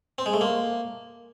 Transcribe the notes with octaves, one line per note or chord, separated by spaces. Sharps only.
C4
G#3
A3
A#3